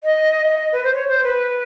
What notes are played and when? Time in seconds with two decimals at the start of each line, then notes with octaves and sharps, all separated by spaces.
0.04 D#5
0.45 E5
0.48 D#5
0.72 B4
0.84 C5
0.94 C#5
1.08 C5
1.24 B4